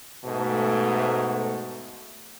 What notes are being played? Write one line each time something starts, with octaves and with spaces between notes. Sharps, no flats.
G#2 B2 A3